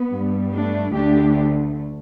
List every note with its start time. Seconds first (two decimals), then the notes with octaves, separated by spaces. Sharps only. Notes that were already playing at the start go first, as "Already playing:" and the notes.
Already playing: B3
0.11 G2 G3
0.53 A3 D4
0.94 D2 D3 A3 D4 G4